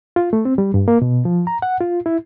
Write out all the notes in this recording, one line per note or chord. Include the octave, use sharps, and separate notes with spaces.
F4
A3
C4
G3
G2
A#3
B2
F3
A#5
F#5
F4
E4